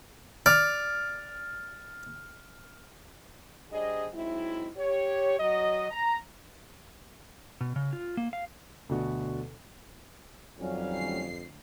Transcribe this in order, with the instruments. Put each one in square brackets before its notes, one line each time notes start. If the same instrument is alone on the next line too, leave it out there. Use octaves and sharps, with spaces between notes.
[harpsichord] D5 [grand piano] F6
[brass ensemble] G3 D4 G#4 C5 D#5
F#3 G#3 C4 D#4 E4
G4 C#5
F#3 D#5
A#5
[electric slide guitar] B2
C#3
F4
A#3
F5
[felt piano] D2 B2 D3 F#4
[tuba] F2 [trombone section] D#3 C#4 [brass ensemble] F#3 G3 F5
[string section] D2 C7